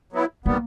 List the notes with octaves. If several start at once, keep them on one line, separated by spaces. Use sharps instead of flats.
F#3 B3 E4
D#3 G3 A#3 B3